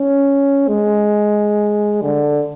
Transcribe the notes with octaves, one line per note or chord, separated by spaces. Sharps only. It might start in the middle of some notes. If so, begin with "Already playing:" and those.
Already playing: C#4
G#3
D3